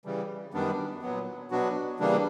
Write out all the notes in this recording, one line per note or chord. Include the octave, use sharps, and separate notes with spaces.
C#3 E3 G3
F#2 D#3 G3 B3 D4
A#2 F#3 B3
B2 F#3 B3 D4 F#4
C#3 E3 G3 A#3 D4